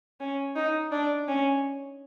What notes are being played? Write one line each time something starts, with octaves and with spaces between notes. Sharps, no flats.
C#4
D#4
D4
C#4